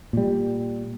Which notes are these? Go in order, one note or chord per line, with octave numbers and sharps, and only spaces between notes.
A#2 G3